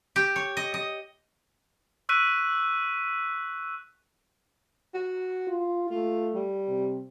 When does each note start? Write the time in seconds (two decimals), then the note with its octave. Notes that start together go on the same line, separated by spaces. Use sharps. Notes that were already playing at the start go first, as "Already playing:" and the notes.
0.16 G4
0.36 C#5
0.57 D#5
0.74 D#5
2.09 C#6 E6 F#6 B6 D#7
4.94 F#4
5.48 F4
5.90 A3 F4
6.34 G3
6.68 C3